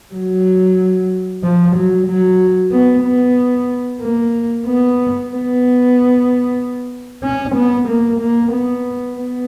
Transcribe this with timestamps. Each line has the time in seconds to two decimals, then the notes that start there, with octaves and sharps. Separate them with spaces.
0.14 F#3
1.44 F3
1.76 F#3
2.07 F#3
2.72 B3
3.04 B3
4.01 A#3
4.66 B3
5.30 B3
7.24 C#4
7.56 B3
7.88 A#3
8.21 A#3
8.53 B3
9.17 B3